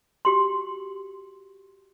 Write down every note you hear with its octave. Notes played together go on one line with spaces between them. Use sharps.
F#4 G4 C6